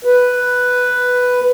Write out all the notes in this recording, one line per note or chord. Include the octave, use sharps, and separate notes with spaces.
B4